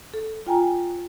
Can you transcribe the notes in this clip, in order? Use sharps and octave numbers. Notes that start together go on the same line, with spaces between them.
A4
F4 G5 G#5 A#5